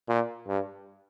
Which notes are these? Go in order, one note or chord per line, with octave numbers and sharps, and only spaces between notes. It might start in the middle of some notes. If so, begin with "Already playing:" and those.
A#2
G2